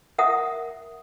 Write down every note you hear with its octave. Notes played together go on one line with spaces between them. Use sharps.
A#4 E5 F#5 D#6